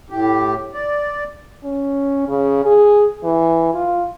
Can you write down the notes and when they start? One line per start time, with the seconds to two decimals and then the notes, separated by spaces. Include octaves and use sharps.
0.10 A2 G4
0.74 D5
1.64 C#4
2.28 C#3
2.65 G#4
3.24 E3
3.74 F4